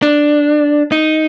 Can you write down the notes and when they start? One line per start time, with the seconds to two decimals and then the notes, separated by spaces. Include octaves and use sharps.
0.02 D4
0.92 D#4